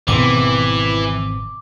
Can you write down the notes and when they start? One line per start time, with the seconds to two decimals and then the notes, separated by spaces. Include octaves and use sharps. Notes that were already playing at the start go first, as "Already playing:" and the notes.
0.08 G#1 B2 E3 B3 C4 D6